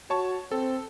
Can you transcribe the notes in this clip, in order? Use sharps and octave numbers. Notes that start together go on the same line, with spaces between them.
F#4 C#5 A5 C#6
C4 A4